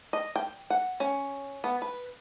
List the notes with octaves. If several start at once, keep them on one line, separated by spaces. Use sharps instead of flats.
D#5
G5
F#5
C#4
B3
B4